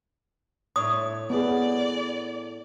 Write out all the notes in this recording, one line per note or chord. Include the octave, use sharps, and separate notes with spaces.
A2 D4 C#5 D#6
B3 G#4 D5